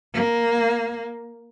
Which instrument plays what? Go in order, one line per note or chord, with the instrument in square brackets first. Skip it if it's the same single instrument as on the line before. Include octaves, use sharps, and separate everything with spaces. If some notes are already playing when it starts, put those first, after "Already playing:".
[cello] A#3